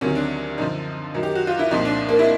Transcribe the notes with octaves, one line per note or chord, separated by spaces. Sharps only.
D2 C3 D#3 F#3 C#4
D4
F#2 D3 F3 D#4
F#2 D#3 F#3
G4
F#4
F4
E4
C2 A#2 F3 D#4
D4
A#3
E4